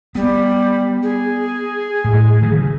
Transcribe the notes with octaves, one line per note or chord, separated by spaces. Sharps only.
G3 B3
G#4
A2
D#3 E3 F#3
C#3